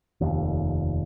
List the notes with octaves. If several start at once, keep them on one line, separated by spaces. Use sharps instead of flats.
F1 D#2